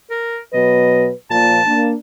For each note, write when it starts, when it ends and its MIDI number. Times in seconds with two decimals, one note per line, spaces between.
0.10 0.39 70
0.53 1.10 47
0.53 1.10 54
0.53 1.10 71
0.53 1.06 75
1.31 1.59 46
1.31 1.59 53
1.31 1.86 81
1.66 1.94 58
1.66 1.94 62